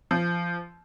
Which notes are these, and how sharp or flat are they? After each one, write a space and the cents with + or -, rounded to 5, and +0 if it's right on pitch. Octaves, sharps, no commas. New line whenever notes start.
F3 -20